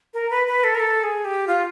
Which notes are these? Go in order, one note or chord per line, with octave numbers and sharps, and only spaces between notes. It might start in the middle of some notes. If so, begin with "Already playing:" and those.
A#4
B4
B4
A4
A#4
A4
G#4
G4
F4